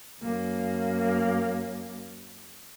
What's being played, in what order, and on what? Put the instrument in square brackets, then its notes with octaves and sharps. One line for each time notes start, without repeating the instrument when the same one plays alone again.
[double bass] F#2 A#3